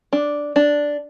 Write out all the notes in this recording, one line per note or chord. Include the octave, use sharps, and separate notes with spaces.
D4
D4